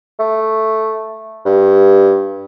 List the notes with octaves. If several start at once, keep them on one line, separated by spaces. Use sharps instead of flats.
A3
G2